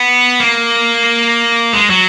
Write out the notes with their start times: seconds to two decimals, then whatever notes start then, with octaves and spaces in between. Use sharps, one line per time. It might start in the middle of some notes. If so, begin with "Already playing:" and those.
Already playing: B3
0.40 A#3
1.73 G#3
1.90 F#3